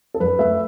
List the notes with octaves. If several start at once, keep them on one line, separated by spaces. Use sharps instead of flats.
A4
F#2 B4
A3 E5